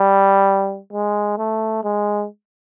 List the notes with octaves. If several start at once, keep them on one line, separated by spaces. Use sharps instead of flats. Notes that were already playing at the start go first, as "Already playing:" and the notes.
Already playing: G3
G#3
A3
G#3